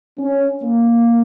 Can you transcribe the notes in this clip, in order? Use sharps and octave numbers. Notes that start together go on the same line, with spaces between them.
C#4
A#3